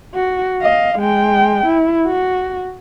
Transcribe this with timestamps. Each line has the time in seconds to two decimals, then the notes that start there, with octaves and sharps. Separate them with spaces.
0.15 F#4
0.62 D#5 F5
0.98 G#3 G5
1.66 E4
2.07 F#4